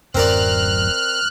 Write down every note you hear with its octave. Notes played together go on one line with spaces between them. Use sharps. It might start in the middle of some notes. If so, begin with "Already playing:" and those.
D1 F#2 C4 A#4 D5 F6 F#6